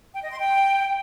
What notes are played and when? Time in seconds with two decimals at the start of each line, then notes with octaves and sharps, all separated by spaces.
0.13 G5
0.21 D#5
0.30 C6
0.38 G5